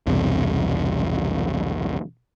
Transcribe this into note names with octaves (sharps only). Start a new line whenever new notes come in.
B1 E2 G2 C3